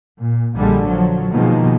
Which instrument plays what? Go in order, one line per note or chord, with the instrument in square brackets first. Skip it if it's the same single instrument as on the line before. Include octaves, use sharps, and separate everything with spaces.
[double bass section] A#2
A#1 A#2 D3 G3 G#3
F3 F#3
B2 D#3 F3 G#3 A#3